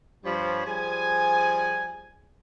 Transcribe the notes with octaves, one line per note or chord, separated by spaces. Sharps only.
G2 F3 G3 C5 C#5 B5
F3 G3 G#4 G#5